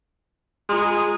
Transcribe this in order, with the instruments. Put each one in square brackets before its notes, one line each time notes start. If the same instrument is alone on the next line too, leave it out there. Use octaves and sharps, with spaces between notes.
[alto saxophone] G#3 [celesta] F4 C6 [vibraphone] A#5 D#6